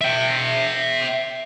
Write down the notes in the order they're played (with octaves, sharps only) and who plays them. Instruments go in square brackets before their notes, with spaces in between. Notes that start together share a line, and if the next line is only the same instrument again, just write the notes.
[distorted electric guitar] E5 G5